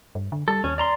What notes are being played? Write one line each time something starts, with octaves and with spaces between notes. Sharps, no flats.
G2
D3
G3 A4
D#2 C#4
D5 A#5 C6